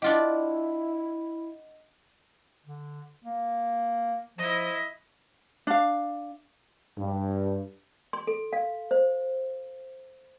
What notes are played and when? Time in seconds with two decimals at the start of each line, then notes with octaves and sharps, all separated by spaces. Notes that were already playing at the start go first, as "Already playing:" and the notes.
0.02 D4 E4 F4 G4 D#5 F#5
2.66 D3
3.24 A#3
4.38 F3 E4 D#5
5.67 D4 F5
6.98 G2
8.13 C6
8.27 A4
8.53 F5
8.91 C5